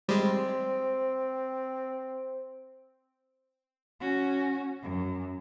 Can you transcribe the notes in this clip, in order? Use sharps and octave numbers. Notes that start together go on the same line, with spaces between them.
G3 G#3 C4
C#4 F#4
F#2